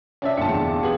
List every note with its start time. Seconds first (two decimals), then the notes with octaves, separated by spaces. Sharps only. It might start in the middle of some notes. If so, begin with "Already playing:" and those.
0.22 C3 F3 C#4 D4 D5 E5
0.37 G2 A#2 D3 F4 C5 F#5 A5 C#7
0.49 E2 D3
0.66 D4
0.83 B3 F4 G4 G#4 F5 F#7